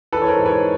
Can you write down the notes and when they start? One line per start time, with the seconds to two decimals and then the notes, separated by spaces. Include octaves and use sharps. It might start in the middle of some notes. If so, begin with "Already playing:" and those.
0.12 E3 A4 B4
0.22 C#5
0.29 A#4 C5
0.38 G#2
0.45 B4 C#5